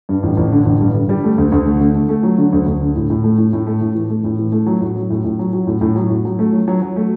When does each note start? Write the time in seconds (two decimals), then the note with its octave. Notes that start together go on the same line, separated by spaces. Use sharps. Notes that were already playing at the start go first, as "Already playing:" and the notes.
0.09 G2
0.23 A1
0.37 A1
0.52 D3
0.65 A1
0.81 G2
0.95 D3
1.09 G3
1.24 A3
1.38 D2
1.52 D2
1.66 A3
1.80 D3
1.95 A3
2.09 A3
2.23 F#3
2.38 D3
2.53 D2
2.66 D2
2.81 D3
2.96 A2
3.10 A2
3.24 A3
3.38 A2
3.53 A2
3.67 A3
3.81 A2
3.95 E3
4.10 A3
4.24 A2
4.39 E3
4.52 A3
4.67 F#3
4.81 A2
4.96 F#3
5.10 A2
5.24 A2
5.39 F#3
5.53 F#3
5.67 A2
5.81 A2
5.96 F#3
6.10 A2
6.25 F#3
6.39 A3
6.53 F#3
6.68 F#3
6.82 F#3
6.96 A3